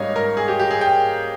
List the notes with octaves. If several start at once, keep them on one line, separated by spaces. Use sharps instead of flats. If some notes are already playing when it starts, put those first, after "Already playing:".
Already playing: G#2 G3 A#3 C#4 C#5 D#5 F5
A#4
G#4
G4
G4
G#4
G5